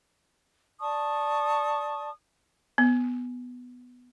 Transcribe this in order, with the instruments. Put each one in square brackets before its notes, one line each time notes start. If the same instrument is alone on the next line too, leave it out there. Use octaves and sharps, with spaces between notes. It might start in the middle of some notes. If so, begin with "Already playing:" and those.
[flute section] D5 A5 C#6 D#6
[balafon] B3